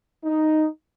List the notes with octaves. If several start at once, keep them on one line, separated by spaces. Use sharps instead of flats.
D#4